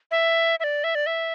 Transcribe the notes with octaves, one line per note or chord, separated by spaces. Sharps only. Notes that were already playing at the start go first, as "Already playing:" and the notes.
E5
E5
D5
E5
D5
E5